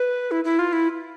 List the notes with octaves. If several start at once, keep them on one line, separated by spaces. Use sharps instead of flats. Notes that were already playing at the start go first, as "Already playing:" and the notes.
Already playing: B4
E4
E4
F4
E4